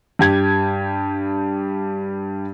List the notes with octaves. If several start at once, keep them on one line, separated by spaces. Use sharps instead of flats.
G2 G4 G#6